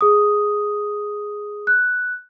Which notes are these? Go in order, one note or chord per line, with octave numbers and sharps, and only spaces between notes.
G#4 D#6
F#6